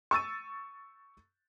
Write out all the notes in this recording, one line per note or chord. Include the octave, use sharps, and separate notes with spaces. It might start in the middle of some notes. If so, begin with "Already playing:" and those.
C#6 E6 A6 D#7